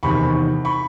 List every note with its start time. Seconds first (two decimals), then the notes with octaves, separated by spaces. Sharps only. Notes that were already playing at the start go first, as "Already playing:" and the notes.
0.03 E2 C3 D#3 B5 C#6
0.65 B5 C#6